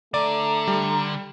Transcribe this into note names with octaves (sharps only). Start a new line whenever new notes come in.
D3 A3 D5 A#5
G3